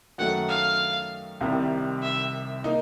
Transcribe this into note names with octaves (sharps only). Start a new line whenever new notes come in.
F#2 D#3 F#3 A3 F#5
F5
C2 C3 D#3 G3
E5
A#3 D#4